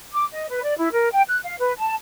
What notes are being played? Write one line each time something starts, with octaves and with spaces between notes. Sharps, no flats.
D6
D#5
B4
D5
E4
A#4
G5
F#6
F5
B4
A5